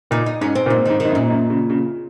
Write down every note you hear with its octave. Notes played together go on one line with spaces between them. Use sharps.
A#2 D#4
D#4
G#2 C#4
C4
A#2
G#2 A#3
G#2 D#3
D#3
G#2
F#2
A#2
F#2
C#3
C#3